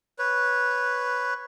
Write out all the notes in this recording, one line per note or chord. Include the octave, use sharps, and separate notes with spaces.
B4 C#5